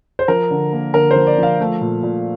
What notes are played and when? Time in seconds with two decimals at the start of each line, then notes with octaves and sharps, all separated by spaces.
0.19 C5
0.28 F3 A#4
0.51 D3
0.73 A#3
0.94 D3 A#4
1.11 F3 C5
1.27 D5
1.38 F3 F5
1.60 A3
1.81 A#2
2.03 A#2